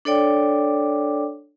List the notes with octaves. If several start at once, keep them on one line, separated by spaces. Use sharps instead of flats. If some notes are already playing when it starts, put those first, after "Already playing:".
D4 A4 C#5 D5 G5 D6